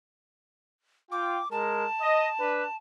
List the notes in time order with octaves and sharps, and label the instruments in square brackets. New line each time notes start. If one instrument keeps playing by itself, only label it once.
[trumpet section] F4 G5 [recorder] D6
[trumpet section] G#3 A#4 [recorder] A5
[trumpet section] D#5
D4 B4